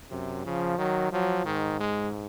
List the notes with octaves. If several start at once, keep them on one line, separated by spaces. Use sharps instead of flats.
F#2 C3
C#3 F3
D#3 F#3
F3 F#3
G#2 D#3
G#3